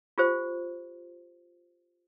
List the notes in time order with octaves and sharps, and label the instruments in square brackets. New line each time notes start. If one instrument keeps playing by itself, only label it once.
[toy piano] F4 G4 C5